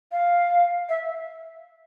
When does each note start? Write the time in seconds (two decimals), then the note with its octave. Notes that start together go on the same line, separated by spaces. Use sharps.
0.12 F5
0.89 E5